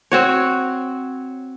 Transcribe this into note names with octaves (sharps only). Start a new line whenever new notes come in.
C4 F#4 C#5